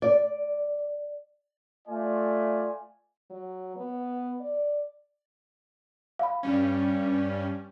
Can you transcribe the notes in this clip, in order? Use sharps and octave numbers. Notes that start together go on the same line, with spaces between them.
D5
A3 F4 D5 G#5
F#3
B3
D5
F5 B5
G2 G3 C#4